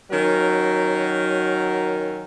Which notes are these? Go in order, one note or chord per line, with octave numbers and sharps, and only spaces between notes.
D#3 F#3 C#4 F#4 A#4